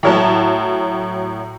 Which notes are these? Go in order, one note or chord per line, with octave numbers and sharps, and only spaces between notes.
A2 F#3 A5